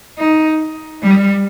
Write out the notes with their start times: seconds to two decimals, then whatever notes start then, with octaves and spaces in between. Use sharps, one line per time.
0.18 D#4
1.03 G3